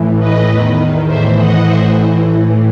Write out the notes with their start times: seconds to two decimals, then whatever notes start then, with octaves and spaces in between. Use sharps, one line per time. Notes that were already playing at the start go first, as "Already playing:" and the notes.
Already playing: A2 E3
0.19 B4 D#5
0.48 E2 D#3
1.07 A2 E3 C5 E5
1.36 D#5 F#5
1.65 A2 E3 C5 E5